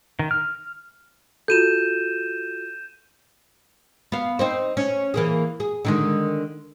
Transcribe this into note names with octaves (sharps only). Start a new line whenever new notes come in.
D#3
F6
F4 F#4 A4 G6 D#7 E7
B3 F5
C4 D#4 C5
C#4
E3 A#3 G#4
G#4
D3 D#3 G#3